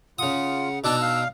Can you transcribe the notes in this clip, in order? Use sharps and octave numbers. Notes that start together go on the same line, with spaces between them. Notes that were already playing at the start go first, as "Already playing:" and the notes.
C#3 F4 F#5 D#6
B2 D4 D#4 D5 E6
F5